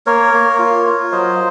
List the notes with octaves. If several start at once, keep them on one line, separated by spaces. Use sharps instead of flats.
A#3 A#4 C#5
A#3
F4
F4
F#3 C5 D#5